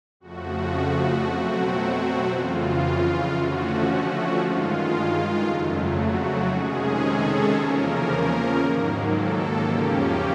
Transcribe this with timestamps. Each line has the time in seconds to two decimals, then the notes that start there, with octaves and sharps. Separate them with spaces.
0.20 F2 C#3 F3 A3 F#4
1.24 B2 F#3 A3 C4 F#4
2.28 F2 C#3 E3 F4
3.33 D3 F3 A3 C#4 F#4
3.85 F#4
4.37 G2 D#3 G#3 F4
5.43 F2 C#3 F#3 A3
5.95 F#4
6.46 C3 D#3 G#3 C#4 G#4
6.99 A4
7.51 E2 C#3 F3 A#3 C#4 A#4
8.56 G#2 D#3 F#3 A#3
9.07 A4
9.60 E2 C#3 F3 A#3 C#4 G4